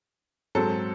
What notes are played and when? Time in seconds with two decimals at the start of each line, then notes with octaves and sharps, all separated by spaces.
0.55 G#2 F#3 C4 A4